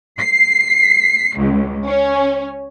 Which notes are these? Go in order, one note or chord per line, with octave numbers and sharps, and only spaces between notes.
C7
C#2
C#4